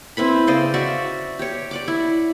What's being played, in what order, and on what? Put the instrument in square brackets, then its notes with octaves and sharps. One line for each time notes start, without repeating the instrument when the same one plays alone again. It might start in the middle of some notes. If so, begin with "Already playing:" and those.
[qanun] C4 E4 B4 B5
C#3 C5 D5 D#5
F#4 D5 E5
G4 C#5
D5 F#5 D6
E4